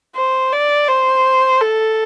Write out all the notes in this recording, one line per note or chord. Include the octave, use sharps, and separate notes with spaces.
C5
D5
C5
A4